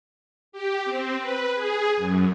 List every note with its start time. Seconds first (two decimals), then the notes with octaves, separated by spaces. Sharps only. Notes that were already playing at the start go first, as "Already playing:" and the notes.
0.52 G4
0.85 C4
1.18 B4
1.55 G#4
1.97 F#2